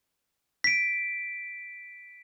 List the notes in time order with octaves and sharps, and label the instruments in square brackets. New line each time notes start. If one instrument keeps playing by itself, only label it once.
[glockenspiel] B6 D7